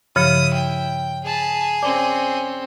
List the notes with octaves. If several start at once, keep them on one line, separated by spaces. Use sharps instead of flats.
G2 C#3 F3 E4 C#5 D#6 F6 C#7
G5
G#4 A5 B5
C4 C#4 D5 D6